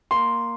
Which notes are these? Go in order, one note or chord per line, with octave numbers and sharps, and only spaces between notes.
A#3 C6